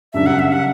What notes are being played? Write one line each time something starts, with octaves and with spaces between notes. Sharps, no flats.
F#2 C#3 G3 D4 E5
F#5
E5
F#5